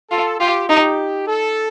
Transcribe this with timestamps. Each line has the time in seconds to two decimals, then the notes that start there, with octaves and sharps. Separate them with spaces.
0.11 F4 A4
0.40 F4 G4
0.69 D#4 G4
1.28 A4